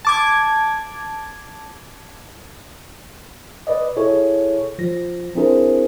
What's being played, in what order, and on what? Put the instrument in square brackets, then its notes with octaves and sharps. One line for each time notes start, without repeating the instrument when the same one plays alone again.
[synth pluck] A5 D6 G#6
[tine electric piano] B4 D5 D#5
E4 G#4 A4 C#5
F3 A#6
C4 D4 E4 G#4 A#4 C5